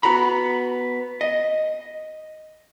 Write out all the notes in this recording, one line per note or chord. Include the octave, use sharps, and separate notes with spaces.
B3 F#4 A#5 B5
D#5